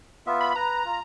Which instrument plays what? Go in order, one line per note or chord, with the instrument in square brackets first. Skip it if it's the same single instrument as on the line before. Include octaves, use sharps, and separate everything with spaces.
[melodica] B3 F4 E5
[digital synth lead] B5
[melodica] B4 [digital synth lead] A#5
[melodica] F4